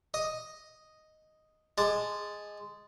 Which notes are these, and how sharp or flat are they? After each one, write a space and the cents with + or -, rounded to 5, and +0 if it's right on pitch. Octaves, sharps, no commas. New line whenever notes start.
D#5 +0 D#6 +0
G#3 +0 A5 +0 D6 +35